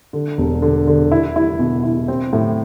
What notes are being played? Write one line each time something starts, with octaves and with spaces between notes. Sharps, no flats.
D3
E1
D3
D3
E4
E4
B2
E4
C4
A2